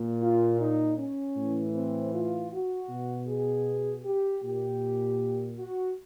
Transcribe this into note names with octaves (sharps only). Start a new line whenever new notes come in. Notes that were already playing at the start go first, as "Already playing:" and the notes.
Already playing: A#2
F4
D#4
C#4
A2 E3
C4
F4
F#4
B2
G#4
G4
A#2 G4
F#4